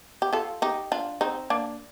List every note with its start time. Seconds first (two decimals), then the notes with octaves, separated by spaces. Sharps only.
0.22 G4
0.33 F4 A4
0.62 D#4 G4
0.92 D4 F4
1.21 C4 D#4
1.50 A#3 D4